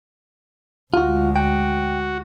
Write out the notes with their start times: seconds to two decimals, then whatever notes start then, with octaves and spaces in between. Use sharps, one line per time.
0.94 D2 G#3 F4 F#4
1.36 F#4 G5